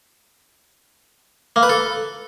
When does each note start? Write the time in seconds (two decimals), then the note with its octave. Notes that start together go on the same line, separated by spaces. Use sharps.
1.56 A#3
1.63 B4
1.69 A4